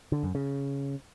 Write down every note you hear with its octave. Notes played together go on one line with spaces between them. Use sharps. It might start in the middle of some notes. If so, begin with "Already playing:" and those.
D3
F#2
C#3